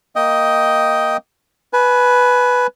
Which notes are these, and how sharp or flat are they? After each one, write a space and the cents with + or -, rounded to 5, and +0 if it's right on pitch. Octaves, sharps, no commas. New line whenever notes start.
A#3 +0 D#5 +10 G5 -10
B4 +0 G#5 +30